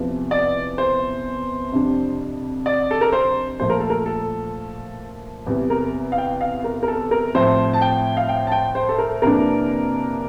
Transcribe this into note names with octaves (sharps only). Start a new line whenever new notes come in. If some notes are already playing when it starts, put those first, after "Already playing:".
Already playing: E2 C3 F3
D5
C5
F2 C3 G3 D4
D5
A4
A#4
C5
A#2 F3 A3 C5
A#4
A4
A#4
A4
E2 C3 G3
A#4
F5
G5
F5
A#4
A#4
A4
A#4
A2 F3 C4 C5
A5
G5
F5
G5
A5
G5
C5
A4
A#4
F2 C3 E3 A#3 D4 A#4